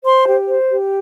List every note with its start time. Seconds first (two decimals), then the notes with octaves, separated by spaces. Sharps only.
0.04 C5 C6
0.27 G4
0.48 C5
0.71 G4